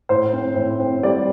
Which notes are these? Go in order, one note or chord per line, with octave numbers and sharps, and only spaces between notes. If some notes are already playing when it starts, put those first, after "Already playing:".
A2 C5
C4
A2
C4
G3 D5